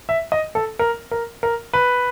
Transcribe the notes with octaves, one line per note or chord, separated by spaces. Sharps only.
E5
D#5
A4
A#4
A#4
A#4
B4